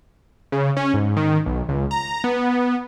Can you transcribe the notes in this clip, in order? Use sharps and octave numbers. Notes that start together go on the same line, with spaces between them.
C#3
C#4
G#2
D#3
B1
C#2
A#5
B3